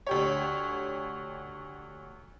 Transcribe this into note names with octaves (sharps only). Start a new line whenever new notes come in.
D2 G4 C#5